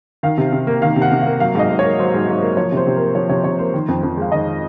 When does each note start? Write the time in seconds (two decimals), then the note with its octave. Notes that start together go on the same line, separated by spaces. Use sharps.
0.23 D#3 F5
0.38 C3
0.52 C3
0.67 A#3
0.82 D#3 F5
0.96 C3
1.02 F#5
1.12 C3
1.21 F5
1.26 A#3
1.40 F#3 F5
1.55 G#2 D#5
1.70 G#2
1.79 A#3 C#5
1.99 F#3 C5
2.14 G#2
2.28 G#2
2.42 A#3
2.57 F3 C#5
2.72 C3 C5
2.87 C3
2.96 A#3 A#4
3.15 F3 C#5
3.29 C3 C#5
3.44 C3 C#5
3.59 A#3 C5
3.74 D#3
3.88 F2
4.03 F2
4.17 G#3 F5
4.32 D#3 D#5